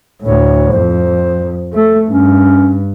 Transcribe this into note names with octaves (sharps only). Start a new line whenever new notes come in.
D2 A2 C#5
F2 C5
A3 A4
G2 C#4